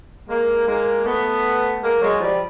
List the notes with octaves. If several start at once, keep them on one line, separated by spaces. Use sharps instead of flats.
G#3 A#3
G#3 A#3
A3 B3
G#3 A#3
F#3 G#3
F3 G3